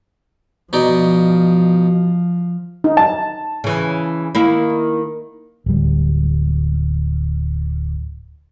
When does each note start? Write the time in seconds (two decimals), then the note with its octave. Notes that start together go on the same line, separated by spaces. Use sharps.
0.73 B2 F3 D#4 D5
2.84 D#4
2.97 A5
3.64 C#3 E3
4.35 D#3 A#3 E4
5.66 D1 G3